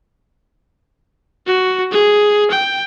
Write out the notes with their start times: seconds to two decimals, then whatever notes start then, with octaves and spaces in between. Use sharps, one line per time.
1.47 F#4
1.91 G#4
2.51 G5